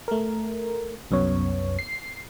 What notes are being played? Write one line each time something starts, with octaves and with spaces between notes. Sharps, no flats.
A3 A#4
C2 F#2 B3 C#5
C7